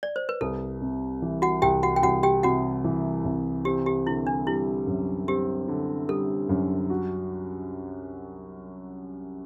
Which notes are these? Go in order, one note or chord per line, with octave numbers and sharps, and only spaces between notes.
D5
C5
B4
C2 A4
C3
E3
F#4 F#5
C2 G4 G5
F#4 F#5
G5
C2 F#4 F#5
G4 G5
C3 F#4 F#5
E3
C2
C4 G4
G4
D3 E4
D4
G3 E4
F#2
C4 G4
D3
G3 A4
F#2
F#4